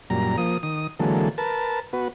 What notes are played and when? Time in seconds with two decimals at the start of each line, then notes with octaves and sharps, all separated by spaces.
0.10 F#2 A#2 G3 A#5
0.38 F3 A#3 D#6
0.63 D#3 D#6
1.00 D3 E3 F#3 G#3 A#3 A4
1.38 A#4 B4 A5
1.93 B3 F#4 B4